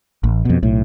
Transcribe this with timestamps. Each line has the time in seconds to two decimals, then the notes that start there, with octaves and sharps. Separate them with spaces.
0.23 A1
0.45 F2 B2
0.62 B1 A2